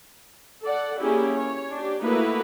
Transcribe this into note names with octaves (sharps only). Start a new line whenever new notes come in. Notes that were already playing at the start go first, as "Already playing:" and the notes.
A4 D5 F#5
A#3 C#4 E4 G4 G#4
C#5
D4 G4
A3 A#3 D#4 E4 F#4 B4